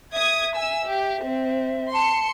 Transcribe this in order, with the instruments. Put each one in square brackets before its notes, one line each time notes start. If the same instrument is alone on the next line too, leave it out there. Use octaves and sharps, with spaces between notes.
[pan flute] E5 [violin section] D#6 G#6
[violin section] G#5 E6
G4
C4
[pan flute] A5 [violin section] C6 C#7